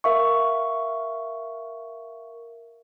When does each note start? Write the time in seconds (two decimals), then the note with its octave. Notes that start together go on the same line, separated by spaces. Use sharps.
0.04 A#4 E5 F5 C#6